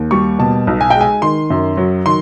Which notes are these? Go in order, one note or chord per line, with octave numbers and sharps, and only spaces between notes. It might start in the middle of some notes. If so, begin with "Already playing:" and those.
Already playing: D#2
G3 C#6
B2 A5
B1
G#5
G#3 G5
G#5
D#3 C6
F#2
F#3
D#3 C6